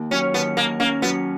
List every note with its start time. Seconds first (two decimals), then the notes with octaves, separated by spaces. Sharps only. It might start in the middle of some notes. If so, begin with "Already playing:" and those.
Already playing: D#2
0.11 F#3 C#4
0.34 D#2 B3
0.56 D#2 A#3
0.80 A#3 C#4
1.02 F#3 B3